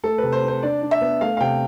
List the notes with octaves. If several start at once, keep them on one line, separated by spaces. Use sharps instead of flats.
A3 A4
B4
C3
C5
C4 C5
D4 D5
D4
E5
B3
A3 F5
F5
C3 G5